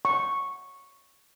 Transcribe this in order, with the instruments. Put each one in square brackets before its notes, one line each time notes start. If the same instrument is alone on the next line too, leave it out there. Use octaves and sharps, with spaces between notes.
[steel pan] C#6